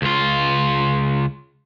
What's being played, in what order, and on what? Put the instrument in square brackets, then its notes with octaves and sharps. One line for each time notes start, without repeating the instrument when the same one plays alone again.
[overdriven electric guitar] C#2 F4